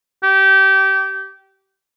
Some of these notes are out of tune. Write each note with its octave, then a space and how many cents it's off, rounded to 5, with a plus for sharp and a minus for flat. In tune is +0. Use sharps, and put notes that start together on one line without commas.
G4 -25